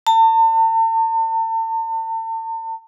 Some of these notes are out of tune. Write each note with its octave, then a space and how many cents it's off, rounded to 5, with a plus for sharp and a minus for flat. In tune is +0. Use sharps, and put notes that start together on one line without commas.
A5 +40